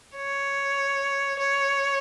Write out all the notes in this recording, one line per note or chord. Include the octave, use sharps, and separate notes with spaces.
C#5
C#5